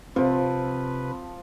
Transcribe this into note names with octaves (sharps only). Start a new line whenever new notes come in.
C3 F3 C4 B4